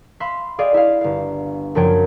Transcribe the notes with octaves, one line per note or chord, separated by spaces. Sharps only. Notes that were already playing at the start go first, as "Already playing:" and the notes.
E5 F5 B5 C6
G#4 D5 D#5 F5 G5
E4 G#4 F5
G1 F5
F#1 F#2 F3 C#5 G5